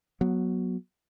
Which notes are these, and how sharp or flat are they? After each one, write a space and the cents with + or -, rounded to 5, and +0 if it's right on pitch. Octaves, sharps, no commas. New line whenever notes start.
F#3 +0 B3 -25